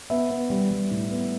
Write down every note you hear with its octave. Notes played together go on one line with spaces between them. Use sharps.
B3 E5
B3
G3
G3
A2
B3